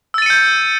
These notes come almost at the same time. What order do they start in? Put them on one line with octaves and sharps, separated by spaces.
E6 A6 D#7 C#7 G6